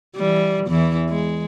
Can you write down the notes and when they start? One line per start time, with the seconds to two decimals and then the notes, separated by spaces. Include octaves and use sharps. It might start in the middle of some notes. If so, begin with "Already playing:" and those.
0.16 E3 G3
0.67 E2 E3
1.09 G#3